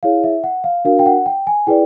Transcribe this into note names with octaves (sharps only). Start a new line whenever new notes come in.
E4 G#4 C#5 F5
E5
F#5
F5
D4 F#4 A#4 F5
G5
F#5
G5
G#5
E4 G#4 B4 D5 G5